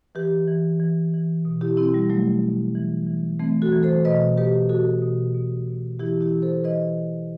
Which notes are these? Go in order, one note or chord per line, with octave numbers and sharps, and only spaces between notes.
E3 G4 B4
E3
E3
E3
B2
E4 G4
B2 C4 E4
G3
B2 F#3 A3
B2
E3
E3
E3 A3 C4
F#4 A4
E3
A4 C5
B2 B4 D#5
B2 G4 B4
B2 F#4 A4
B2
B2
B2
E3 E4 G4
E4 G4
E3
A4 C5
E3 B4 D#5
E3